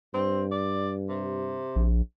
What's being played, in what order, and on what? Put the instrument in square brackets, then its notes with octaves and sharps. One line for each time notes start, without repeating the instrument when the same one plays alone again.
[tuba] G2 [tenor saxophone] C4
[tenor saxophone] D5
C3
[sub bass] A#1